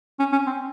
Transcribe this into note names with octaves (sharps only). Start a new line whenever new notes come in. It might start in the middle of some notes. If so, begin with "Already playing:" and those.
C#4
C#4
C4